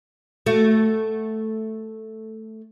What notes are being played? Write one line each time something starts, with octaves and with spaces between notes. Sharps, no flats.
A3 F#4